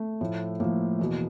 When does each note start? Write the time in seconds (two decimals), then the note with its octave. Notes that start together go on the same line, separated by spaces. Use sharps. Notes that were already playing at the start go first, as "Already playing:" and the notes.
Already playing: A3
0.21 A2 F3
0.60 A2 F3 A#3
0.99 E2 B2